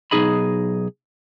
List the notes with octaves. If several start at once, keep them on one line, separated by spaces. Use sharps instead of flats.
B1 D#4 G#4 D#5 B5